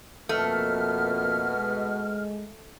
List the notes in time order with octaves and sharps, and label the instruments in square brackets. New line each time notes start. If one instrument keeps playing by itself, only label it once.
[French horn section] F2 A#3 [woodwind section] B2 F6 [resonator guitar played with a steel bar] A3
[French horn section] G#3